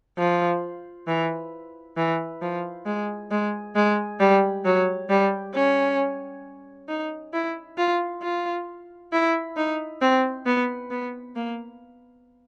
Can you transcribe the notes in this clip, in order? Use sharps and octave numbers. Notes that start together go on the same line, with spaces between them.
F3
E3
E3
F3
G#3
G#3
G#3
G3
F#3
G3
C#4
D#4
E4
F4
F4
E4
D#4
C4
B3
B3
A#3